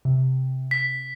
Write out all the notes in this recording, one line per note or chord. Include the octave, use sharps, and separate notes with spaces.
C3
B6